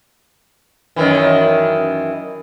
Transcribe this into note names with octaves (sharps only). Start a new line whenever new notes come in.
F#2 D#3 E3